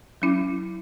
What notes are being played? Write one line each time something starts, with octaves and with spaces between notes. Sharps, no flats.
F#3 C#4 E4